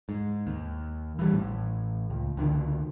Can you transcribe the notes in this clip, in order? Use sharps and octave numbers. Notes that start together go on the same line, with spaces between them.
G#2
D#2
E3 G3
A1 A2
C#2
C#2 D3 D#3